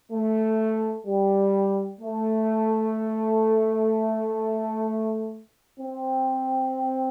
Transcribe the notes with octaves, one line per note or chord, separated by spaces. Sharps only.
A3
G3
A3
C4